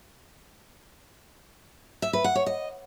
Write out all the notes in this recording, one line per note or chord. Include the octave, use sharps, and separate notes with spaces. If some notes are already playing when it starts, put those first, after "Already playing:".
E5
B4
F#5
C#5
D#5